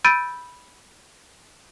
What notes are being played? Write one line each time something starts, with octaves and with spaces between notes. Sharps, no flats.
B5 E6 G6 A6 D7 D#7